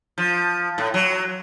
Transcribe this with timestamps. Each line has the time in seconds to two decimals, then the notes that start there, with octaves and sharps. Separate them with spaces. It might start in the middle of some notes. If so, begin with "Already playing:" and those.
0.18 F3
0.78 A2
0.94 F#3